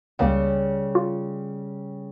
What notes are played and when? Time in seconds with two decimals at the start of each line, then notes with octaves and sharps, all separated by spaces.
0.19 C#2 C#3 G3 A#3 F5
0.95 F4